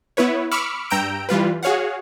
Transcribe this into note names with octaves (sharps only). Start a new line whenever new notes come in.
B3 E4 B4 C#5
B5 C#6 D6 E6 F6 C#7
G2 G5 A#5 E6 G6 D7
E3 G3 F4 B4
F#4 G#4 C#5 F5 F#5